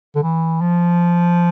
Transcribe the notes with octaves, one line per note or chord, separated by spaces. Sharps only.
D3
E3
F3